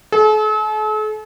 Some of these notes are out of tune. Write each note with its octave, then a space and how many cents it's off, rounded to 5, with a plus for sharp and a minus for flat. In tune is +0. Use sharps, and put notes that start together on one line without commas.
A4 -45